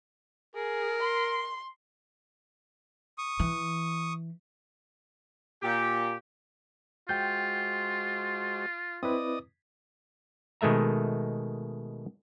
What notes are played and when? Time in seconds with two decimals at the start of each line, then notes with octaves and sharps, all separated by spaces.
0.56 G#4 A#4
1.03 C6
3.18 C#6 D#6
3.40 E3
5.62 A#2 G4
7.09 G#3 F4 F#4 C5 G5 G6
9.03 C4 E4 B4 D5 D#5 D#6
10.61 B2 D#3 G#3 A3 E5 A#5